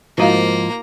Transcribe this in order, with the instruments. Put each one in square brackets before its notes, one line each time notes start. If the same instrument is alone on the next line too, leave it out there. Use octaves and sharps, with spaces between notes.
[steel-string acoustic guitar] G#2 F3 [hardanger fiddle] A#3 A#5 [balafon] E4 F#4 F5